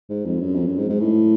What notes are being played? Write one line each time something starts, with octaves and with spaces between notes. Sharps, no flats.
G#2
F2
F#2
F2
F#2
G#2
G#2
A2